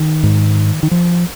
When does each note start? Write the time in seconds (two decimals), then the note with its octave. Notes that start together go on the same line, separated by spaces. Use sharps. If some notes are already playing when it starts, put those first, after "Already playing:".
Already playing: D#3
0.23 G#2
0.83 D#3
0.91 F3